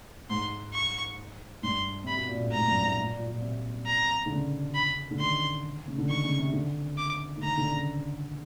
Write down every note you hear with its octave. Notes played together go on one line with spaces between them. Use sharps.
G#2 C6
C#6
G2 C6
C3 B5
B2
A#2
A2
G#2 A#5
G2
F#2
G#2
A#2
A#2
A#2
C3
A#5
D3
C#3
B5
D3
D#3 C6
C#3
D3
D#3 C#6
C#3
C3
D3
D6
D3
D#3 A#5
D3
C#3